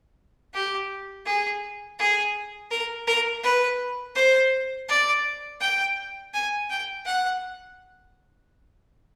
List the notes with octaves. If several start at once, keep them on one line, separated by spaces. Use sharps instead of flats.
G4
G#4
G#4
A#4
A#4
B4
C5
D5
G5
G#5
G5
F#5